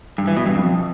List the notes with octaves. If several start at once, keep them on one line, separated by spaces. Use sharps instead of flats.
G2
E3
B2
G2
F2